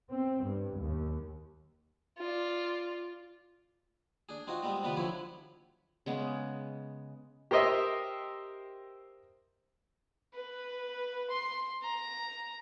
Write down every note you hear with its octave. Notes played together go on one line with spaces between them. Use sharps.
C4
G2
D#2
F4 D5
D4 G#4
C4 D#4 F4 F#4
G3 G#3 B3 C4
C3 D#3 G3 B3 F4 B4
D3 F3 F#3 D4 E4 C#5
C#3 G#3 B3
G4 A#4 C5 D#5 E5
B4
C6
A#5